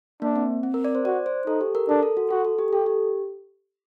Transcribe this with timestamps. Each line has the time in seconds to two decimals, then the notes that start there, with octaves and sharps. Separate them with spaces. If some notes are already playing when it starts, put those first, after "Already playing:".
0.22 A#3 D4
0.36 C4
0.63 C4
0.74 A#4
0.85 D5
0.95 C5
1.05 F#4 D5
1.26 C5
1.47 D#4 A4
1.61 G4
1.75 A#4
1.89 D4 A4
2.03 A4
2.17 F#4
2.30 F#4 A4
2.45 A4
2.58 G4
2.72 G4 A4
2.86 G4